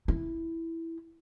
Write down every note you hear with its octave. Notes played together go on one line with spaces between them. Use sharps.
E4